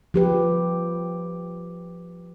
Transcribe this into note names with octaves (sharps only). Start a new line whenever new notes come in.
F3 G4 B4